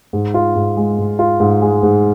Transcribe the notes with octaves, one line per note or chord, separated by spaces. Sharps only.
G#2
F4
G#2
G#3
G#2
F4
G#2
G#3
G#2